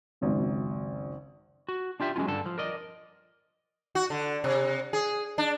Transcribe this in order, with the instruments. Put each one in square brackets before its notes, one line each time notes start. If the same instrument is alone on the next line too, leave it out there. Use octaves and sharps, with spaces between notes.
[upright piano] G#1 C#2 F#2
[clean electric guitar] F#4
D4 F4 G4 E5
F#3 G#3 C#4 D#4 F4
G2 D3 A4
F3
A#4 D5 D#5
[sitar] F#4
D3
C3
G#4
D4